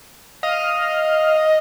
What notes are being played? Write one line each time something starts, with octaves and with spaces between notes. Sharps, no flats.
D#5 F5